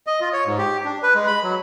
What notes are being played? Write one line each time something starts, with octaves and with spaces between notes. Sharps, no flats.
D#5
F4
C#5
G#2
G4
D4
B4
G#3
B5
F#3